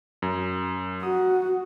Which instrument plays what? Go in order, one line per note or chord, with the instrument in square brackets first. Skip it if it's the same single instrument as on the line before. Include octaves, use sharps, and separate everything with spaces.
[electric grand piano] F#2
[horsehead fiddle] F#4 [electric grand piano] D#6